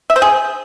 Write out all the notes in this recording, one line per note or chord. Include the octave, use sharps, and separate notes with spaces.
E5
C5
G#4